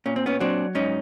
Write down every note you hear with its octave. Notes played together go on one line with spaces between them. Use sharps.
A#2 C#4
C4
B3 C#4
F#3 C4 D4
G#2 C#4 D#4